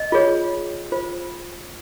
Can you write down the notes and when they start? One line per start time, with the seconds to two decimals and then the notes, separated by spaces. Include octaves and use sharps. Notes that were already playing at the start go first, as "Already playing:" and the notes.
Already playing: D#5
0.12 F4 G#4 C#5
0.92 F4 C5